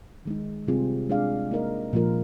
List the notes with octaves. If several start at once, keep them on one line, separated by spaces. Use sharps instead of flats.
D#3 G#3 D#4
C3 G3 C4 F4 G#4
G#3 D4 G#4 D5 F5
A#3 D#4 A#4 D#5
A#2 F3 A#3 F4 A#4